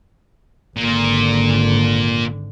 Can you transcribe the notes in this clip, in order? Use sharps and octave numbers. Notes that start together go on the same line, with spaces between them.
G#1 A#2 D3